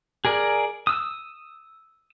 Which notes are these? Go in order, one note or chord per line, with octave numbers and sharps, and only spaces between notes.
G#4 A#4 D5
D#6 E6